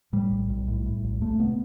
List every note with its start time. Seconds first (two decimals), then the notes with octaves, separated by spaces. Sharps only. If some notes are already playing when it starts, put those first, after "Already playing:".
0.13 A2 G3
0.31 B1
0.49 B1
0.68 A2
0.86 A2
1.04 B1
1.21 C2 A3
1.40 C3 B3